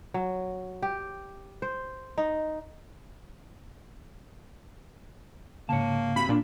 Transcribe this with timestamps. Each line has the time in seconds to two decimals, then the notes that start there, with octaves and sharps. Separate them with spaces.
0.14 F#3
0.82 G4
1.62 C5
2.18 D#4
5.69 G#2 C#3 A#3 C#5 A5
6.16 C4 F#4 G4 B5
6.29 A#2 D4